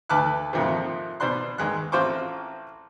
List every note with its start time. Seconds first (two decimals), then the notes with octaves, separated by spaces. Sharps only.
0.09 D2 B4 A5 D6 F6 F#6
0.53 F2 G#2 C3 D#3 F3
1.20 B2 C5 D5 C6 F#6
1.58 D#2 G#3 F#6
1.92 A1 C4 F4 C5 C#6 D6